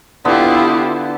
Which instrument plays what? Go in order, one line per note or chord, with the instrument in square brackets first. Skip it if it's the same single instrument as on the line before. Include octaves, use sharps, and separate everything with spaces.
[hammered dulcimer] D3 B3 [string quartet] E4 F4 G4